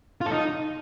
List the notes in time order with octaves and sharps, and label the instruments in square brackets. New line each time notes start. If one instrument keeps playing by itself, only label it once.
[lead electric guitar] F4
A4
D#4